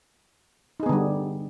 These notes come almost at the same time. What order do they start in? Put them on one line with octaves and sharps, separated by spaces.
D#4 G#4 B3 D3 G3